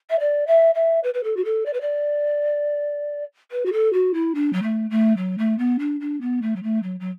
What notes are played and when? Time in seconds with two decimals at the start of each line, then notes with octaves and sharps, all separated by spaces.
0.10 E5
0.19 D5
0.47 E5
0.75 E5
1.03 B4
1.14 B4
1.24 A4
1.36 F#4
1.45 A4
1.66 D5
1.73 B4
1.81 D5
3.51 B4
3.65 F#4
3.72 A4
3.93 F#4
4.14 E4
4.35 D4
4.53 F#3
4.62 A3
4.90 A3
5.17 F#3
5.38 A3
5.58 B3
5.79 D4
6.00 D4
6.21 B3
6.42 A3
6.56 F#3
6.63 A3
6.83 F#3
7.00 F#3